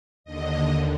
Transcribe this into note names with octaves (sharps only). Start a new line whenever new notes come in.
D#2 D3 D#5